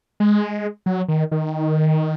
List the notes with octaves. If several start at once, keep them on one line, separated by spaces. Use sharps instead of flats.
G#3
F#3
D#3
D#3